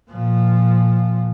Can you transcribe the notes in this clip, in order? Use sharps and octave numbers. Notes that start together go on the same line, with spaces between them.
A#2 F3